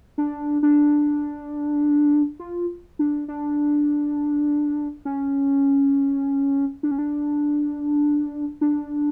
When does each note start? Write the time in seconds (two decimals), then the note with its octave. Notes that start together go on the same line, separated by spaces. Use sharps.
0.18 D4
0.63 D4
2.40 F4
2.99 D4
3.28 D4
5.05 C#4
6.83 D4
6.91 C#4
6.98 D4
8.61 D4